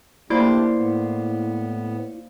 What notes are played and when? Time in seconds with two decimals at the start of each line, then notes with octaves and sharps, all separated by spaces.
0.30 A3 A#3 D4 E4 G4 C5 D5
0.75 A2 B3